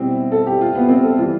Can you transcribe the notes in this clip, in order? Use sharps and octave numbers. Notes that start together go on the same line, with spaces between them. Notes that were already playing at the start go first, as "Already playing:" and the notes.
Already playing: B2 G3 C4 E4 G4
A4
G4
F4
B3
C4
A4
E3 G3 F4